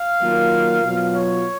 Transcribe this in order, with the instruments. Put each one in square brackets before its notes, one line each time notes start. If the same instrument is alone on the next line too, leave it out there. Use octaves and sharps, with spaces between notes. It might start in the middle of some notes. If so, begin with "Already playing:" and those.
Already playing: [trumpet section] F5
[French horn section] D#3 F#3 A#3 F4 A#4
B2 F#3 B3 F4
[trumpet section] C#5